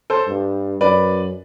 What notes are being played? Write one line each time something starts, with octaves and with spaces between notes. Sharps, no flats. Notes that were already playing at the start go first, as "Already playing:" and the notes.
A4 C5
G2
F#2 B4 D5